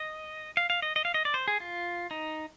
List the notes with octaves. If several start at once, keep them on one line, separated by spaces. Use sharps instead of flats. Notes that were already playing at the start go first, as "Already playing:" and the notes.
Already playing: D#5
F5
F5
D#5
D#5
F5
D#5
D5
C5
G#4
F4
D#4